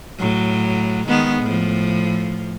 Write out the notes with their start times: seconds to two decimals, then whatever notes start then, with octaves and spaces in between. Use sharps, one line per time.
0.19 A2 F#3
1.08 D#3 G#3 B3
1.43 A2 F3